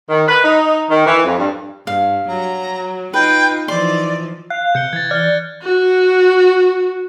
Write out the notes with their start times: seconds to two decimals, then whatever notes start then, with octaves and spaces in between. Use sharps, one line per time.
0.09 D#3
0.27 B4
0.44 D#4
0.89 D#3
1.05 E3
1.24 F2
1.37 G2
1.87 G2 F5
2.29 F#3 A#5
3.14 D#4 F4 B4 G5
3.68 E3 F3 D#4 D5 C6
4.50 F5 F#6
4.75 C3 G6 C#7 G7
4.93 E3 G#6 A6
5.11 D5 F6 G7
5.63 F#4